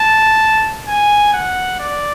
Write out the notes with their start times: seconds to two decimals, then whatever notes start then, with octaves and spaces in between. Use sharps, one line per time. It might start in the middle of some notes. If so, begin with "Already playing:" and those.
Already playing: A5
0.88 G#5
1.33 F#5
1.80 D5